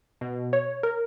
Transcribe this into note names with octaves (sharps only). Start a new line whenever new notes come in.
B2
C#5
A#4